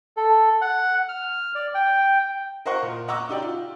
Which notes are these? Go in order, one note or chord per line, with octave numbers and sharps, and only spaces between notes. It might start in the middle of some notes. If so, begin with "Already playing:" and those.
A4
F#5
F6
D5
G5
A#4 C5 D#5 F5 F#5 C#6
A#2
D#5 F#5 A#5 C#6 D6 E6
D#4 G4 D5
F4